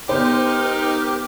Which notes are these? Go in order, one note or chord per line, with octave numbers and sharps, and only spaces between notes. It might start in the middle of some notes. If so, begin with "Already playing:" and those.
B3 D#4 G4 A#4 C5